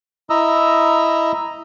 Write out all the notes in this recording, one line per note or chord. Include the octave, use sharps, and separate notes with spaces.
E4 D#5 A#5 E6